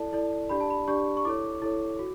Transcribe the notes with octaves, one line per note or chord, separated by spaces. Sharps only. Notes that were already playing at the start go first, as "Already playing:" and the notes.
Already playing: E4 A4 D5 A5
E4 A4 D5
D4 G4 D5 B5
A5
B5
D4 G4 D5 C#6
C#6
E4 A4 C#5 D6
E4 A4 C#5
F#4